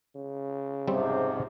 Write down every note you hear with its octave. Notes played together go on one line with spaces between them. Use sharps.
C#3
F2 G#2 C3 G3 C4